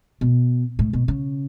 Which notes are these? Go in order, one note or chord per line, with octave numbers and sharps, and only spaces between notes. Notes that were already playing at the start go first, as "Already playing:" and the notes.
B2
A2
B2
C#3